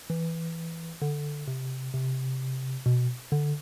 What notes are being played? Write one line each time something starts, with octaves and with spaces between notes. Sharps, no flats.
E3
D3
C3
C3
B2
D3